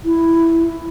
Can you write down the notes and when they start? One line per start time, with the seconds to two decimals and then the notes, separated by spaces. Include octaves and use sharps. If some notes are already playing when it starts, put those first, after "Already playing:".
0.05 E4